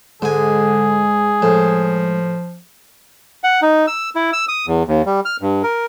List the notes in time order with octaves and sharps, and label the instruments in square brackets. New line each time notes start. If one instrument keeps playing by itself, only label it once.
[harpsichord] G#2 G#5 [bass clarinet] D3 [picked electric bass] G#3 [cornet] G#4
[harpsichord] A2 [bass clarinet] F3
[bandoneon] F#5
D#4
E6
E4
E6
D#6
E2
D#2
G3
F6
G2
A#4